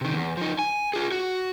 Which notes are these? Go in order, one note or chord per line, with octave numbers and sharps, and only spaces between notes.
C3 D#3
E2
F3 D#4
G#5
F4 G#4
F#4